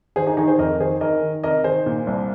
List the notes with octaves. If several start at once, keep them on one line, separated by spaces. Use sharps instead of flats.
D#3 G#4 C5
D#4 G#4
D#3 D#4 G#4
G#4 C5
F2 A#4 D#5
D#3 G#4 C5
D#3 A#4 D#5
D#3
C3 A#4 D#5
D#3 G#4 C5
A#2
C2